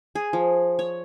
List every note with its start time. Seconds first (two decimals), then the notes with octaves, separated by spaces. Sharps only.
0.15 G#4
0.33 F3
0.79 C#5